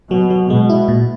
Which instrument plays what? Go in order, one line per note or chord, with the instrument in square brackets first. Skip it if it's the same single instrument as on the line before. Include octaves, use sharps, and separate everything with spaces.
[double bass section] B2 [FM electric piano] F#3
[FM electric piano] F#3
[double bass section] B2 [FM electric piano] G#3
[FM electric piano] E4
A#2